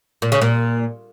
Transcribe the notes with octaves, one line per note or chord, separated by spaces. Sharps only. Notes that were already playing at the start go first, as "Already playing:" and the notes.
A#2
C#3
A#2